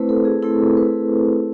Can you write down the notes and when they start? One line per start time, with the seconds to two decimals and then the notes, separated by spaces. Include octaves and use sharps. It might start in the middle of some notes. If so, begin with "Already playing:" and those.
Already playing: A3 C4 E4 B4 C5
0.09 A4
0.25 G#4
0.42 A3 C4 E4 A4
0.77 B4